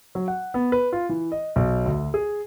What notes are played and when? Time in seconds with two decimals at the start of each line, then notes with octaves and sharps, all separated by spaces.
0.15 F#3
0.28 F#5
0.54 B3
0.72 B4
0.93 F4
1.09 E3
1.32 D#5
1.56 B1
1.86 D2
2.14 G#4